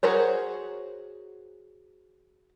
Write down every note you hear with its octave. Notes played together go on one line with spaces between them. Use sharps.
F#4 G#4 A#4 C5 C#5